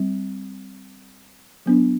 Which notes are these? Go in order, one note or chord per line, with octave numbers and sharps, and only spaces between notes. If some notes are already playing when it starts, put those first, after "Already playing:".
Already playing: G3 C4
F#3 B3 D4